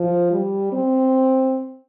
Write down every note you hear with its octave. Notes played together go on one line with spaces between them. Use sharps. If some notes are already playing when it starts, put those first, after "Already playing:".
Already playing: F3
G3
C4